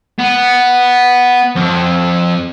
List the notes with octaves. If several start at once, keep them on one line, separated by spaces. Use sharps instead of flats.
B3
F2